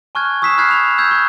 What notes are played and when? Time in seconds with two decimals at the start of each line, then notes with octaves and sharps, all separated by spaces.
0.15 G#5 A5 C#6 F6 F#6 G#6
0.42 C#6 D#6 E6 B6 C7 E7
0.58 B5 F6 F#6 G#6 B6 C7
0.71 F7
0.98 E6 G6 G#6
1.11 C#6 F#6